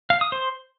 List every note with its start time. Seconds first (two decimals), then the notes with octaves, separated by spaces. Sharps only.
0.10 F5
0.21 D#6
0.32 C5